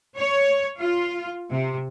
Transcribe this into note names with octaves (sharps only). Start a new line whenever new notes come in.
C#5
F4
C3